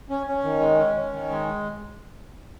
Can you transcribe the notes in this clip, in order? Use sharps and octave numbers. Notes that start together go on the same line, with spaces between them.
C#4
C#4
D#3
G#3
C#4
C#4
D#3
G#3